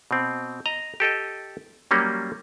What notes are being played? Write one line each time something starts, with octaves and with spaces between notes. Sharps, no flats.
B2 C4
D#5 A#5
G4 A4 D#5 G5
F#3 G3 A#3 C#4